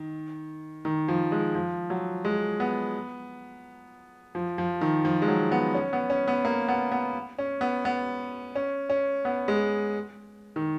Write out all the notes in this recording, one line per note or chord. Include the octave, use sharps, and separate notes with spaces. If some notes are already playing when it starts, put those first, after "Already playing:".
Already playing: D#3
D#3
F3
G#3
F3
F#3
G#3
B3
F3
F3
D#3
F3
G#3
F#3
B3
C#4
B3
C#4
B3
A#3
B3
B3
C#4
B3
B3
C#4
C#4
B3
G#3
D#3